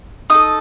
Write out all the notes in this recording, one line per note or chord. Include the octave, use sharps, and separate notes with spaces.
D#4 A4 D#6